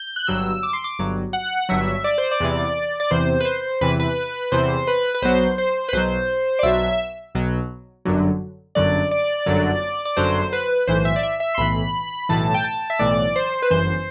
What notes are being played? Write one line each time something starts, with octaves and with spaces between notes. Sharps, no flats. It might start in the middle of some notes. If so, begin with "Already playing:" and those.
Already playing: G6
F#6
G1 G2 F#3 E6
D6
C6
D6
G1 G2 F#3
F#5
G1 G2 F#3 E5
D5
C5
D5
E2 C3 E3
D5
E2 C3 E3 C5
B4
C5
E2 C3 E3 B4
B4
E2 C3 E3 C5
B4
B4
B1 B2 F#3 C5
C5
B4
B1 B2 F#3 C5
D5
B1 B2 F#3 E5
B1 B2 F#3
G1 F#2 D3 F#3
G1 F#2 D3 F#3 D5
D5
G1 F#2 D3 F#3
D5
G1 F#2 D3 F#3 C5
B4
B1 A2 E3 C5
E5
D5
E5
E5
C6
B1 A2 E3 B5
B1 A2 E3 A5
G5
A5
E5
B1 A2 E3 D5
C5
B4
G1 F#2 E3 C5